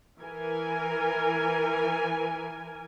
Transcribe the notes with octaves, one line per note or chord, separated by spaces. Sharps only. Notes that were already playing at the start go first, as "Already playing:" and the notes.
E3 A#4 G#5